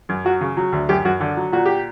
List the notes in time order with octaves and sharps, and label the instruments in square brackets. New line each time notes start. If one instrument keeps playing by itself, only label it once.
[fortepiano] F#2
F#3 F#4
C#3
F#3
D2
F#2 G4
F#2 F#4
D3
F#3
A#2 F#4
G4